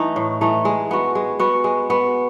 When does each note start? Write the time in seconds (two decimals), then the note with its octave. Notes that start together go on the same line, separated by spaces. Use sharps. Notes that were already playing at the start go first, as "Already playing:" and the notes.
Already playing: E3 A3 D#4
0.16 A2
0.41 E3 A3 D#4
0.65 G#3
0.91 B3 F#4
1.15 G#3
1.39 B3 F#4
1.64 G#3
1.90 B3 F#4